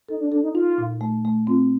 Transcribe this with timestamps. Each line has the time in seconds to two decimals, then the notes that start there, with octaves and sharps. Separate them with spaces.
0.09 D#4 A4
0.20 D4
0.31 D4 A4
0.43 D#4
0.55 D#4 F4
0.78 A#2
1.01 A3
1.25 A3
1.47 C4 F4